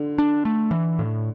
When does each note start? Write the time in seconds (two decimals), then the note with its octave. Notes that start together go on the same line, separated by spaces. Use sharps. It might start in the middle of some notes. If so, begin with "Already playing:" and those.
Already playing: D3
0.18 D4
0.45 A3
0.71 E3
0.99 A2